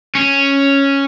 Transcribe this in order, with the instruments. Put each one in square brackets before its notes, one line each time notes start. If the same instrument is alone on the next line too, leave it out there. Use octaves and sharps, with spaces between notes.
[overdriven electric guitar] C#4